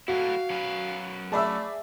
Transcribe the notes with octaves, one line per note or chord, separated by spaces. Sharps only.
F#3 A3 E4 F#4 F5
F#3 C#4 B4
A3 G#4 D5 E5 A5 B5 E6